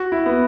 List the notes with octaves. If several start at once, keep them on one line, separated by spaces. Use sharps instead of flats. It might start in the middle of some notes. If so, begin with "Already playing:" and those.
Already playing: F#4
E4
B3